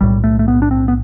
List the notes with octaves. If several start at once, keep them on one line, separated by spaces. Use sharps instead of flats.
B1 A2 G3
A3
A3
B3
D4
C4
B3